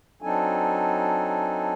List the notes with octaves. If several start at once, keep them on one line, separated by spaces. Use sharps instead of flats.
F#3 C4 D4 D#4 A4 G#5